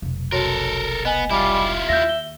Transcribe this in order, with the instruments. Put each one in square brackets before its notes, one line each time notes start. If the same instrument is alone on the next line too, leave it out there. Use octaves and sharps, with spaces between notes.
[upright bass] F1 B1
[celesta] F#4 C#5 [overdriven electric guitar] A4 A#4
[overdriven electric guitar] B3 [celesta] D#5 G#5
[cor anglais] G3 [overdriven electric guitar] E4 F4
[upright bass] D#2 [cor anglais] E5 [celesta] G6 A#6
[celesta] G7